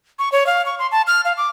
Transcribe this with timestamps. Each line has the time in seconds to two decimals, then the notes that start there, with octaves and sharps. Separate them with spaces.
0.19 C#6
0.32 C#5
0.47 F5
0.66 C#6
0.79 C6
0.92 A5
1.07 F6
1.25 F5
1.37 D6